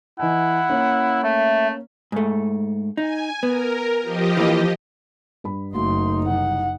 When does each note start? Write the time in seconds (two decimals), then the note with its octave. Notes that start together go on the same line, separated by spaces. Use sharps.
0.20 E3 E4 D#5 F#5 G#5
0.70 A#3 C#4
1.24 A3 E5
2.12 G#2 A3
2.97 D#4 G#5
3.43 B3 A#4
4.02 F3 G4 D#5
4.37 E3 A#3
5.44 G2 B5
5.74 F#1 A3 A#3 D#4 F#4 C6
6.26 C2 F#5